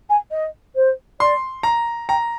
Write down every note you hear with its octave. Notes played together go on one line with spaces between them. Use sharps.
G#5
D#5
C5
D5 C6
A#5
G5 A#5